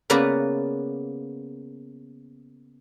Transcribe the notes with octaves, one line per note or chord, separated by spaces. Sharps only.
C#3 A#3 B3 B4 D5 A#5